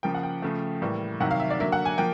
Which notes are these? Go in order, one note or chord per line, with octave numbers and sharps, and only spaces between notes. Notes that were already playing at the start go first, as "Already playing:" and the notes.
C#3 F3 A#3 G5
F#5
G5
C#3 F3 A3
A2 E3 G3 A#3
C3 D#3 F#3 F#5
F5
E5
D5
D3 F#3 A#3 E5
F#5
G#5
F3 A#3 G5